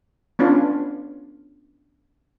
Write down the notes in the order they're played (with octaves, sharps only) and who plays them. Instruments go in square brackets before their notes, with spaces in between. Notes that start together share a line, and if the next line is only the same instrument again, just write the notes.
[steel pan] B3 C#4 D4 F4